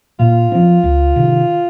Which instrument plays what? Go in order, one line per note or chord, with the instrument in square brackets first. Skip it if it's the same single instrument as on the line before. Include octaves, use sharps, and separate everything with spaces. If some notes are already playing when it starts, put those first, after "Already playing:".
[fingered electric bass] A#2 [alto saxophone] F4
[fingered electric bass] F3 C4
C#2
C3 D#3